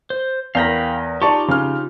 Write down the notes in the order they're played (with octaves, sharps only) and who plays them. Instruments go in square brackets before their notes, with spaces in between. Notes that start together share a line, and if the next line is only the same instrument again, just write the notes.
[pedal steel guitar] C5
[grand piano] E2 A#4 A#6 [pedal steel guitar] F5 G5 B5
[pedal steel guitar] D#4 F4 G4 [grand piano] D5 A5 C#6
[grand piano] C#3 F6